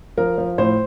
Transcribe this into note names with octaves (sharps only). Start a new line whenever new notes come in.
F3 A#4
F3
A2 C5